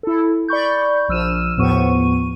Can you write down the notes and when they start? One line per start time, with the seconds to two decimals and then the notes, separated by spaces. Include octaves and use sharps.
0.03 E4 A4
0.49 D5 B5 C#6 G6
1.08 A#1 F3 E6 F6 D#7 E7
1.57 D#2 A2 F3 B3 C#6 D#7